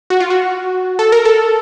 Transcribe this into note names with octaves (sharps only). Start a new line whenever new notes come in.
F#4
F4
F#4
A4
A#4
A4